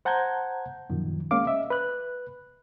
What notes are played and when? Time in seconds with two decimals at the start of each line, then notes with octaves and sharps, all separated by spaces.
0.05 C5 F#5 A5 A#5 G6 G#6
0.90 F#2 A#2 D#3 F3
1.31 G#3 A#3 C#4 F5 D6
1.47 D#5 E5
1.70 B4 F#6